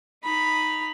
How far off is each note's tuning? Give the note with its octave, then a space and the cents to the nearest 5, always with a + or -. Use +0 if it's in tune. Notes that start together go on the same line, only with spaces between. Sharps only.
D#4 +0 B5 +0